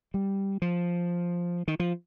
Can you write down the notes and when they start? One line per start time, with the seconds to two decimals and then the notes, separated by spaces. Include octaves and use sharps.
0.14 G3
0.62 F3
1.68 D#3
1.80 F3